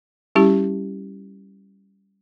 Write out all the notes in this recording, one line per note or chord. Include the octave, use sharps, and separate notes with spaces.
G3 C#4 E4 G4